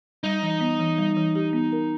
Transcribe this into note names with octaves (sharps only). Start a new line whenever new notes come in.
G3 D#4
E3
B3
E3
G3
E3
G4
B3
A#4